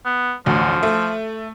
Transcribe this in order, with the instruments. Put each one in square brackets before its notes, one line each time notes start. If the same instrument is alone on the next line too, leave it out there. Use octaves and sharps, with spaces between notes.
[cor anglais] B3
[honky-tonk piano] A1 D2 [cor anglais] F3
[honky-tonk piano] A3